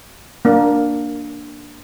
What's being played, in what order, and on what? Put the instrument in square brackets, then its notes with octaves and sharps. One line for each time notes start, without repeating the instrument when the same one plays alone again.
[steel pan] A#3 D4